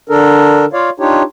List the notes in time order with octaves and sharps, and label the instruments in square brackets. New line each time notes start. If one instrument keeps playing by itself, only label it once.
[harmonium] D3 D4 A4 A#4
F4 C#5 D5 F5
D4 D#4 F4 G4 C#5